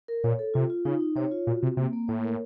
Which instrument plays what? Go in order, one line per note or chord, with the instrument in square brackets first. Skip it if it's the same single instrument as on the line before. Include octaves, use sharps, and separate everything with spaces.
[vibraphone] A#4
[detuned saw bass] A#2 [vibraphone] C#5
[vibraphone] A4
[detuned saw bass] C3 [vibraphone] F4
[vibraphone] F4
[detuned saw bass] C#3 [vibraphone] D#4
[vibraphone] D#4
[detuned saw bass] C3 [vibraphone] C#5
[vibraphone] F4
[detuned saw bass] A#2 [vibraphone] F#4
[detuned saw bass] C3 [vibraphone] C4
[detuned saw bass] C3 [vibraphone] A#3
[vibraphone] A#3
[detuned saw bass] A2 [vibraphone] C#5
[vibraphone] A#4